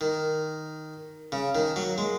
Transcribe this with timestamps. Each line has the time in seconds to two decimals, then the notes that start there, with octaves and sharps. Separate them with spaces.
0.01 D#3
1.32 C#3
1.55 D#3
1.76 F#3
1.98 G#3